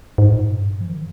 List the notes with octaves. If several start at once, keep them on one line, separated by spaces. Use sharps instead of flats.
G#2
A#2
G#2
G2
F3
D#3